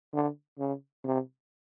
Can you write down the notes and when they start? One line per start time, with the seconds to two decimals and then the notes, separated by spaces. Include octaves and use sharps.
0.14 D3
0.58 C#3
1.04 C3